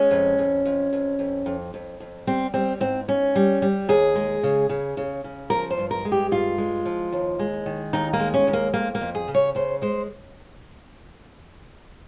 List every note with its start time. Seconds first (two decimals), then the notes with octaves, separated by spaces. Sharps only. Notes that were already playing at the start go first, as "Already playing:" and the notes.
Already playing: G#3 C#4
0.11 F2
0.38 F2
0.65 F2
0.93 F2
1.19 F2
1.46 F2
1.74 F2
2.00 F2
2.27 G3 C4
2.54 G3 C4
2.80 G#2 C4
3.08 G#2 C#4
3.36 G3
3.62 G3
3.88 D#2 G#4
4.16 G#3
4.43 C#3
4.69 C#3
4.97 C#3
5.24 C#3
5.50 F3 A#4
5.70 C5
5.77 G2
5.91 A#4
6.05 G#3
6.12 G4
6.31 G2 F4
6.58 G#3
6.86 F3
7.12 D#2
7.39 G#3
7.66 D#3
7.93 D#2 D#4
8.13 A#3
8.20 G#3
8.34 C#4
8.47 D#2
8.53 A#3
8.74 F2 A#3
8.95 A#3
9.01 F2
9.15 G#4
9.28 C#3
9.35 C#5
9.55 C#3 C5
9.82 G#3 C5